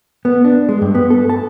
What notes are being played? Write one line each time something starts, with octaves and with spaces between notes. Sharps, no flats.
B3
D4
G#3
G2
B3
A4
A5